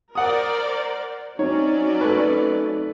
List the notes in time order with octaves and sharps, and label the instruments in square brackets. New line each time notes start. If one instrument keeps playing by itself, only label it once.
[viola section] A#4 C5 D5 [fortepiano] F#5 D#6
[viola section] F#3 C#4 D5 [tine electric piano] C4 D#4 [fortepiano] C#5
[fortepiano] A3 B4